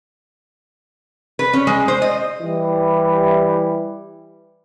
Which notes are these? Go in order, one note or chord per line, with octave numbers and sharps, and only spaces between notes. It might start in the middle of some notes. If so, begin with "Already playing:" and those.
B4
C#4
G#3
C5
D#5
E3 G3